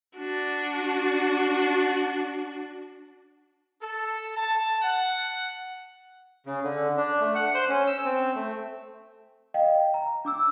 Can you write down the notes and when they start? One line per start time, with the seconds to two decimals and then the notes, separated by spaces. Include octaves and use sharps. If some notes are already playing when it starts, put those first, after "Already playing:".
0.17 D4 F#4
3.82 A4
4.36 A5
4.82 F#5
6.46 C#3
6.64 D3
6.97 D4
7.20 A3
7.35 F#5
7.54 C5
7.69 C#4
7.87 E6
8.05 C4
8.35 A3
9.54 D#5 F5 G5
9.94 A#5
10.25 D4 D6 E6